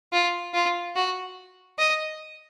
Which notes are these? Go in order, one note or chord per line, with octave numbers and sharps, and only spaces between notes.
F4
F4
F#4
D#5